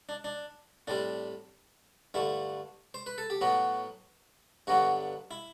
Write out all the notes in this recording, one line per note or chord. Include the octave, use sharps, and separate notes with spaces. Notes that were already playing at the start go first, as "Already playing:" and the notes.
D4
D4
A2 G3 C4 D4
G2 D3 A3 E4
C5
B4
A4
G4
A2 F#3 B3 F#4
G2 D3 F#3 B3 F#4
E4